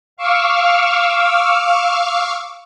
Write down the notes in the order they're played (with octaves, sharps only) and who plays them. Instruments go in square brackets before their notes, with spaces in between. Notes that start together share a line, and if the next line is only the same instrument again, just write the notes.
[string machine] F5 C#6 D6 E6 F6